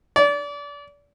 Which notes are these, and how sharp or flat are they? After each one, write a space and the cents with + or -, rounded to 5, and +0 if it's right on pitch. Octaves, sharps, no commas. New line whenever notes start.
D5 -30